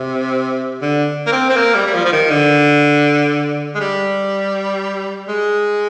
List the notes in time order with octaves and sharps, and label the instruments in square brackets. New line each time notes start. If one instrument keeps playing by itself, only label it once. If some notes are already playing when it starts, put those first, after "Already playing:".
Already playing: [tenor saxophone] C3
D3
A#3
C4
C4
A#3
G3
G3
F3
F3
D#3
D3
G#3
G3
G#3